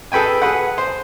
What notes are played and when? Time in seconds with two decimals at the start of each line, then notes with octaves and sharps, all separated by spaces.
0.12 G#4 A4 B4 G5 G#5
0.42 G#4 B4 F#5
0.78 C5